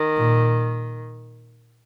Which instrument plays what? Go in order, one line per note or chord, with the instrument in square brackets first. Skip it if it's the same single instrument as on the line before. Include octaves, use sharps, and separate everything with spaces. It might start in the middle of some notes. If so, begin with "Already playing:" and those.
Already playing: [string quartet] D#3
[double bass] A#2